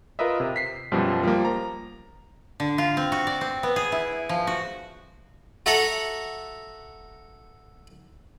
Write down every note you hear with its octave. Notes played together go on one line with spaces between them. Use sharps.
F4 A#4 B4 D#5 E5
C3
B6 C7
F#2 B2 F3 G3
F3 G3 A#3
A#5
D3
F4
C4
F#4
D5
C4
B3
G#4
E4
F3
F#4
F#4 A4 E5 F#5 A#5